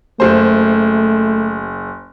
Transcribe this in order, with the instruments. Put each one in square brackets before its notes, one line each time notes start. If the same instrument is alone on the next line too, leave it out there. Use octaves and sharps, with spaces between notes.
[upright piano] F#1 C5 [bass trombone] A3